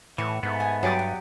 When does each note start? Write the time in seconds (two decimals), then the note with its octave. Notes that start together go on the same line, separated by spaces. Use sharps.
0.18 A2 E3 F#5
0.43 G#2 A3 B3
0.60 G#5 D#6
0.83 G2 F#3 G4 G#4 D5 A5 D#6
0.99 B3